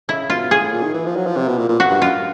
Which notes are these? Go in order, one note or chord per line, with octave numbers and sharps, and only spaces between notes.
C#3 E4
B2 F4
A2 G#4
A#2
D#3
E3
F3
F#3
F3
C3
B2
A#2
A#2
F#4
G2
F#2 F4